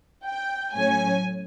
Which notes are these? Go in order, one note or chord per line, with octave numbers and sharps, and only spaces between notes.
G5
A2 F#3 A3 C#4 G#5